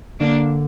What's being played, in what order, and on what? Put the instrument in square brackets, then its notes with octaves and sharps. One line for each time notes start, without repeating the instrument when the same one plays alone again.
[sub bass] D3 [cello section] A#3 D4